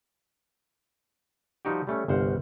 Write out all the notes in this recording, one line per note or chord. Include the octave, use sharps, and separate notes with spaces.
F3 G3 D#4 F#4 G4
G3 A3 C#4
G1 C2 C5 F5 F#5